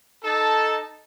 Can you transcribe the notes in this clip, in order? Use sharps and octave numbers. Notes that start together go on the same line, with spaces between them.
D#4 A4 A5